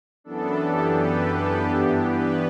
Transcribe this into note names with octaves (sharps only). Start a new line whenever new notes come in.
F#2 E3 B3 D4 A4
G4
B4
G4
G2 E3 B3 D4
B4